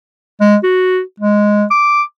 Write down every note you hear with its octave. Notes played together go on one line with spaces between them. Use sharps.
G#3
F#4
G#3
D6